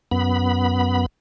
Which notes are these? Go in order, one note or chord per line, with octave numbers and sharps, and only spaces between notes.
F#2 B3 B5